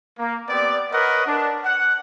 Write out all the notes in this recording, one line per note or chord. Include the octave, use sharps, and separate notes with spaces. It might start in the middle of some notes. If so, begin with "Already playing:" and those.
A#3
B3 C4 G4 D5
A#4 B4 C#5 D#5 F#5
D4
F#5